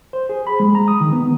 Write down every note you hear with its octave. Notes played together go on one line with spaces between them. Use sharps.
C5
G#4
B5
G#3
A#5
D#6
D#3
B3